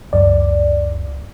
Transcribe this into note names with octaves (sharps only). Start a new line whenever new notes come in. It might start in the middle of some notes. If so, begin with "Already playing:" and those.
C#2 F#2 D5